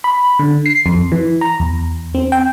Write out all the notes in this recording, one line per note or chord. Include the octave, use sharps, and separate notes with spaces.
B5
D3
C7
F2
E3
A#5
E2
C4
G5